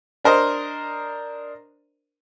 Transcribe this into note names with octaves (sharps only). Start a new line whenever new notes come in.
D4 A#4 C5 D#5